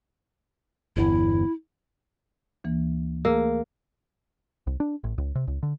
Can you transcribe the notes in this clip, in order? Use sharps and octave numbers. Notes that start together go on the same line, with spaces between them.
G1 E2 E4
D2 E3 A#3
A3 A#3 G#4 E6
C2
D4
A1
C#2
C3
C#2
D3